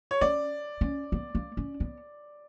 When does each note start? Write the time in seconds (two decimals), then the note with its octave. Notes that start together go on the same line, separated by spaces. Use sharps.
0.11 C#5
0.21 C#4 D5
0.81 C#4
1.12 B3
1.35 A#3
1.57 C#4
1.80 B3